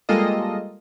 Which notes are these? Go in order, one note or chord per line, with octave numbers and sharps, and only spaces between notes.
G3 G#3 A#3 F4 A4 D#5